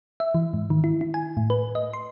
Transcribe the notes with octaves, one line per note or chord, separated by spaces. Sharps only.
E5
E3
G#2
D#3
E4
E4
G#5
A2
B4
D#5
C6